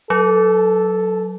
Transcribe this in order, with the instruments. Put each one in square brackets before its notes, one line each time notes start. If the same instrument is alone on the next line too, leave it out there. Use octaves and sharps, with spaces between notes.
[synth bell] F#3 [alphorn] A4